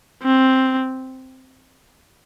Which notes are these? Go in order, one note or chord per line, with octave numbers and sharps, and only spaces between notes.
C4